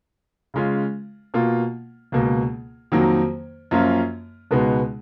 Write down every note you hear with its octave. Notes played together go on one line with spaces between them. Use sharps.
C#3 G#3 C#4 F4
B2 A#3 F4
C#2 B2 A#3
F2 D#3 F#3 A#3
F#2 F3 A#3 C#4 F4
C#2 B2 G#3 B3 D#4